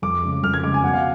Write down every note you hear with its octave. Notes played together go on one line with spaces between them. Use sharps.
F2 D6
C#3 G#3
F2 F6
G#6
C#3 G#3 D6
G#5
B2 F#5
F5